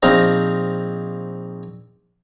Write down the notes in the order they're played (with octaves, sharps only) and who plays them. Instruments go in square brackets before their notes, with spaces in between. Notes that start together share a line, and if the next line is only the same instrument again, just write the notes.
[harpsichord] A#1 C4 D#4 F5 A#5